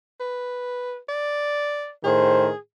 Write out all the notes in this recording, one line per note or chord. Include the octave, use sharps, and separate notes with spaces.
B4
D5
A2 D#3 G#4 C5